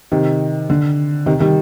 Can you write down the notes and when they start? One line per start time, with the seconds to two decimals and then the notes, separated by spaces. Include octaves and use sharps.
0.12 C3 D#3
0.70 D3
1.26 C3 D#3
1.40 D#3 G3